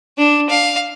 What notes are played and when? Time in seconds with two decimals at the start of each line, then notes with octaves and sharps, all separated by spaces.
0.18 D4
0.49 F5